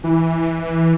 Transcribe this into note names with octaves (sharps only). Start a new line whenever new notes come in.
E3